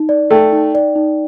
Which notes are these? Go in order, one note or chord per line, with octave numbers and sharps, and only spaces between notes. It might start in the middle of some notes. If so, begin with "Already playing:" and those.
Already playing: D#4
D5
A3 G5
D#4
D5
D#4